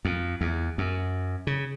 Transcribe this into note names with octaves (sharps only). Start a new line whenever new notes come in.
F2
E2
F#2
C#3